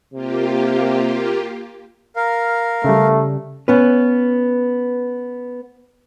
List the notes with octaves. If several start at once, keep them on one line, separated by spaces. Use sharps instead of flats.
C3 A#3 F4 G4
A#4 F5
C#3 G3 A3
B3 C#4 B4